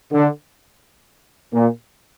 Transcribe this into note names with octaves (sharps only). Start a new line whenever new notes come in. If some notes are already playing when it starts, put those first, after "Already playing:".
D3
A#2